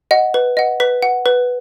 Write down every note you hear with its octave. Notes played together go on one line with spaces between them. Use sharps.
D#5 F#5
B4
D#5 F#5
B4 B6
F#5
B4